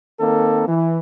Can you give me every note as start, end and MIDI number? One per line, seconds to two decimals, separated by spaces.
0.19 0.66 51
0.19 0.66 58
0.19 0.66 60
0.19 0.66 69
0.68 0.99 52